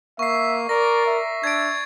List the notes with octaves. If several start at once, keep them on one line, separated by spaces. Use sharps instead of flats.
A#3 E5 C#6 C7
A#4 D5 A#6
E5
D4 G#6 A6 D7